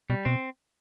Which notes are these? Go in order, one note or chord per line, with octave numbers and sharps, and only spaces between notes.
B2 G3
B2 C4